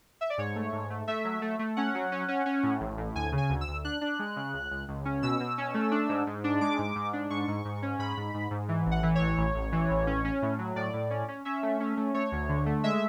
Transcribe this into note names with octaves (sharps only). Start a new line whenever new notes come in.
E5
D5
G#2 C#5
A3
G#2
A3
A3 E5
F#3
A3
A3
C#4 F#5
F#3
C#4
C#4
C#4
A2
A1
A2
D2 G#5
C#3
G#5
D2
E6
D2
D4 F#6
D4
G#3
C#3
C#2
C#2
C#2
C#4
B2 E6
B2
C#4
A3
D4
G#2
G#2
D4
G#3 D6
G#2
G#2
D4
G#2 C#6
G#2
G#2
C#4
G#2 B5
G#2
G#2
G#2
E3
A1
F#5
E3
C#5
A1
A1
A1
E3
A1
C#4
C#4
A2
F#3
A2 D5
A2
C#4
C#4
C#4 E5
A3
C#4
A3
A3 C#5
D2
D3
A3
G#3 E5